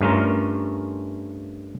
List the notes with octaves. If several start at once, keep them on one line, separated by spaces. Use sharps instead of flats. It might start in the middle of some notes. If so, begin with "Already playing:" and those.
G2 A3 C#4 F4 A#4